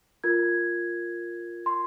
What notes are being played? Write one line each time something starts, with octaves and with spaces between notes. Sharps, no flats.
F4 A#4 G#6
C6